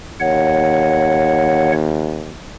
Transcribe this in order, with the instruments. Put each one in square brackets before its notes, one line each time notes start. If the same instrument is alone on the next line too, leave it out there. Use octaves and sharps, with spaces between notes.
[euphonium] D#2 [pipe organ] C#5 F#5